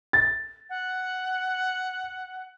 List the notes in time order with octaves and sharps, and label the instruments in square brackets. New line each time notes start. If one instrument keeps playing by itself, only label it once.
[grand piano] A6
[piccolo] F#5